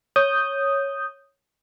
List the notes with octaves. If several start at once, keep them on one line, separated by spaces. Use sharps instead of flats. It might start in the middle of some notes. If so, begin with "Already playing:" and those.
C#5 D#6 G6